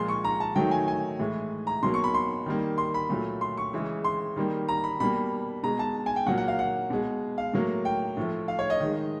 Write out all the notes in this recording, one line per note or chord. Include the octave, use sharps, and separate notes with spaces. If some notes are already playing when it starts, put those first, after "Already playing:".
Already playing: A#2 F3 G#3 C6
C#6
A#5
A5
D#3 F#3 A3 G5
G#5
G#5
A2 E3 G#3
A#5
B2 F#3 A#3 C6
C#6
B5
C6
D#3 G3 A#3
C6
B5
A#2 F#3 A3
C6
C#6
C#3 E3 G#3
C6
D#3 G3 A#3
A#5
B5
B2 G3 A#3 B5
B2 G#3 A#5
A5
G#5
G5
A#2 F#3 A#3 F#5
F#5
F5
F#5
B2 G#3
F5
A2 F#3 A#3
G5
A2 F3 A3
F5
C#5
D#5
D#3 G#3